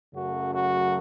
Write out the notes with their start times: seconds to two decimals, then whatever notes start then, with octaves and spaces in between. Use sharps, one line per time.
0.13 F#2 C#3 F#3 A3 F#4
0.53 F#4